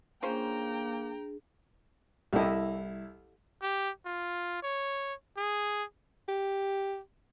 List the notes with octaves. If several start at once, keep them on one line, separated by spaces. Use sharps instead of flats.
A#3 C#4 D4 F4 G#4 C5 G5 A#5
C2 E4 G4 A4 D#5
G4
F4
C#5
G#4
G4